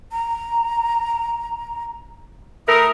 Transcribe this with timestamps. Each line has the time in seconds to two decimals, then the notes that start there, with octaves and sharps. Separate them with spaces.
0.12 A#5
2.68 A3 E4 A#4 D#6